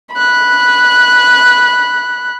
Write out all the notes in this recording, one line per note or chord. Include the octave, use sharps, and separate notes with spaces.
B5 F#6